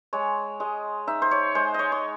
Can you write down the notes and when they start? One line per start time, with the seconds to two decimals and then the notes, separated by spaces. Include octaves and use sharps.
0.13 G#3 C#5
0.60 G#3 D#5
1.08 D#4 E5
1.22 C5
1.31 C#5
1.55 G#3 C5
1.74 C#5 D#5
1.92 C#5